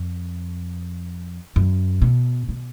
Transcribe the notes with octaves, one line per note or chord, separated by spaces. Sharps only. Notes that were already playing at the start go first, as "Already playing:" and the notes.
Already playing: F2
F#2
B2
B2